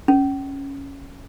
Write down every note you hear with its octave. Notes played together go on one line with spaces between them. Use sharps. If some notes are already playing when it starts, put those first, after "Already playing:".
C#4